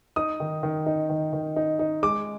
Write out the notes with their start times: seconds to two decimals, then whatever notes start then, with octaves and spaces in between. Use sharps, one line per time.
0.16 D#4 D#6
0.40 D#3
0.63 D#3
0.86 D#4
1.09 D#3
1.33 D#3
1.56 D#4
1.79 D#4
2.03 G#3 D6